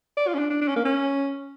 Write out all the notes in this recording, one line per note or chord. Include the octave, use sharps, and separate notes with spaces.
D5
F4
C#4
D4
D4
D4
C#4
A#3
C#4